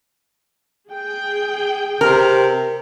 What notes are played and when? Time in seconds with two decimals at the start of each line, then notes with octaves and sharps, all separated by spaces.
0.90 G#4 G5
2.01 C3 A#4